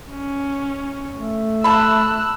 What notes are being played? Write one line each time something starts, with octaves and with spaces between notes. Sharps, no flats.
C#4
A3
A5 B5 E6 F#6